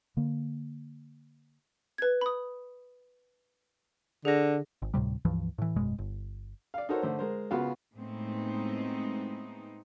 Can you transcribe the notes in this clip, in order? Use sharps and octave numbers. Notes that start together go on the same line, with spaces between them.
D3 A#3
B4 G#6
B5 D#6
D3 G#4 A#6
G#1
D2 A2 C3 G3
C#2 G2 E3 F3
A2 E3
G#1 F#2 B2 G#3
G1
D5 F5
D#4 F#4 A4 A#4 C5 C#5
D3 A3 C5
G#3 A#4 C5
C#3 B3 F4 F#4 F5
A2 G#3 B3 C4 D#4